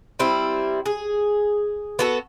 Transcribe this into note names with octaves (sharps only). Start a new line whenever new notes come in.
G3 C4 E4
G#4
B3 F#4 A4